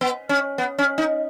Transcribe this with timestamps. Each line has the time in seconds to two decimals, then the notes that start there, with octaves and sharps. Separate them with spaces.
0.01 B3
0.29 C#4
0.58 B3
0.78 C#4
0.98 D#4